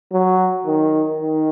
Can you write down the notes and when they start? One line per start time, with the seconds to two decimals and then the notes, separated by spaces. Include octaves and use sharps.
0.12 F#3
0.66 D#3
1.20 D#3